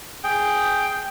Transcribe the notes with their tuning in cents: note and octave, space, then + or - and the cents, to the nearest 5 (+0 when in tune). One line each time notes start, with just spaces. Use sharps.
G#4 +0 G5 +0